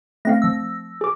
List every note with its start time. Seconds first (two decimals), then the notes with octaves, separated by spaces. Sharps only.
0.25 A3 C4 F5 A#6
0.42 F3 E6
1.01 G#4 D6